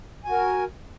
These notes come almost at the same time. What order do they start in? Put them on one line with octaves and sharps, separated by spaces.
G#5 F#4 A#4